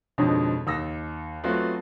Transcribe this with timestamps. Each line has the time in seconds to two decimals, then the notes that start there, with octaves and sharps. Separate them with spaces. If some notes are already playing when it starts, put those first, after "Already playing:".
0.18 F2 G#2 B2 D3 C#5
0.67 D#2 E6 A#6
1.44 F#3 A3 B3 C4 F4 F#4